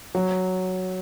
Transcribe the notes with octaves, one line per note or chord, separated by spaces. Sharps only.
F#3